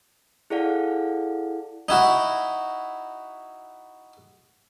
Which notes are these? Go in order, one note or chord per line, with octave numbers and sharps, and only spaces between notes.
E4 G#4 A4 D5 F5 F#5
D#4 E4 F#4